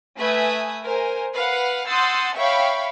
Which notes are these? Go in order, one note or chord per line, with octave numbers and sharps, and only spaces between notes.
A3 B4 E5 G#5 D#6
A#4 C5 G#5
B4 F5 F#5
F#5 C6 D#6 E6 G6 A6
C#5 E5 F5 G5 B5 C#6